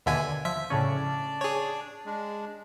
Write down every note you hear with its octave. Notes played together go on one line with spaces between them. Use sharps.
D#2 B2 D3 E5 G#5
F3 E5 B6
A2 C#3 C#4 D4 D5
G#4 C#5
G#3 D4